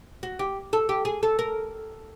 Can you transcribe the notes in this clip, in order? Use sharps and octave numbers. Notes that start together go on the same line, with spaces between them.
F#4
G4
A4
G4
G#4
A4
A#4